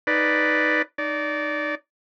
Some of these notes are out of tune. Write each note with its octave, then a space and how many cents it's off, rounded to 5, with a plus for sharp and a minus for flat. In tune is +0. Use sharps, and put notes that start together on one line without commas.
D#4 +0 B4 +0 D5 +0
D#4 -20 D5 -20